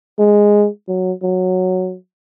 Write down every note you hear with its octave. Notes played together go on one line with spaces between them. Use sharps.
G#3
F#3
F#3